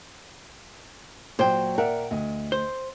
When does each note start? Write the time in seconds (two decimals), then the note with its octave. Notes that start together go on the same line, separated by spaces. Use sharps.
1.39 A#2 F#3 C5 G5
1.78 A#4 D5 E5 F#5
2.11 D2 D#5
2.52 C5